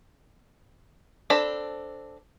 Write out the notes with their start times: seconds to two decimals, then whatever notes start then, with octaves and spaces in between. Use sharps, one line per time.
1.30 C4 D4 A4 B5